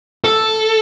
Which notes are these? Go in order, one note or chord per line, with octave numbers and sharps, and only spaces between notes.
A4